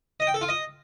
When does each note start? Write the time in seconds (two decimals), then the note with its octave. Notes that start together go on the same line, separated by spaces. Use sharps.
0.20 D#5
0.27 G5
0.34 A4
0.41 F4
0.49 D#5